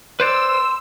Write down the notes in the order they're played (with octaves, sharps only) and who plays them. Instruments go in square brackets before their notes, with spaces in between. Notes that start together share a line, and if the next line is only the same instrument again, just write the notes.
[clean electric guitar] B4 C5 D5 [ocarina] C6 [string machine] E6